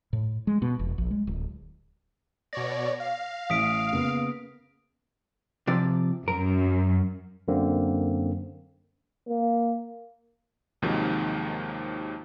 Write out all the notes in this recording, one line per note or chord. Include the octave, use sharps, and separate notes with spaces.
A2
G#3
B2
F1
A#1
G#3
D1
B2 C#5 D5 A#6
F5
A1 D#6 B6 D7
C#3 A#3 B3
C3 F3 D5
F#2 A#4
F#2 D3 A#3 C4
A#3
D#2 G#2 C3 D#3 F3 F#3